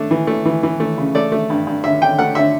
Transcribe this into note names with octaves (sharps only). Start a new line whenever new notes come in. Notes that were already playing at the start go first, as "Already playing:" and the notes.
Already playing: A3 D4
E3
A3
E3
E3
A3
C#3
A3 D5
A3
G2
G2
D3 E5
D3 G5
A3 F#5
D3 E5